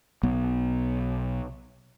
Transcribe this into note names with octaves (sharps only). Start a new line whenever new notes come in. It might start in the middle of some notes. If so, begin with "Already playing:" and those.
B1 B3